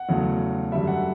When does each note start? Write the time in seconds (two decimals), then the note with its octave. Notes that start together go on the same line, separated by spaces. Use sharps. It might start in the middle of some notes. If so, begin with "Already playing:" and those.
Already playing: F#5
0.09 E2 C#3 F#3 A3
0.72 F#2 D3 G3 E5
0.87 F#5